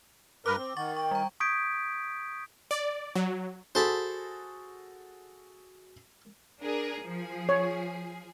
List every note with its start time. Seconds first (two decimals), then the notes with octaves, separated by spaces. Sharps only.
0.46 G2 A#4 B4 D6
0.58 C4
0.77 D#3 F#5 C#6 A6
0.97 G5 C#6
1.11 G3 A#5
1.40 C#6 D#6 G6 G#6 B6 D7
2.71 D5
3.16 F#3
3.75 F#4 G#4 A4 C5 A5 B5
6.61 D4 G#4 A#4
7.02 F3 G#4
7.49 C#5